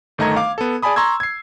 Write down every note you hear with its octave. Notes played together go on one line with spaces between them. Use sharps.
G1 D#3 A3 D#5 A#5 G#6
F5 D6
B3 A4
G#4 D5 G#5 A5 B5 D#6
A#5 C6 C#6 E6 G#6
G#6 C7